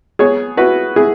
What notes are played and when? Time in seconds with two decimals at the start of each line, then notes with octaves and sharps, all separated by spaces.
0.19 B3 G#4 C#5
0.57 E4 F#4 B4
0.96 E4 G#4